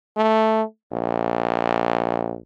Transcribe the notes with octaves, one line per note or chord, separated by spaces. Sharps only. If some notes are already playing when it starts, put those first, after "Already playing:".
A3
A#1